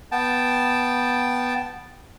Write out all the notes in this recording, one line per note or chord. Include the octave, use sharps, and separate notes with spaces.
B3 G5 A5